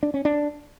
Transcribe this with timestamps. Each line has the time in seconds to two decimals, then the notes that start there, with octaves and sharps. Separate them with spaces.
0.03 D4
0.14 C#4
0.25 D4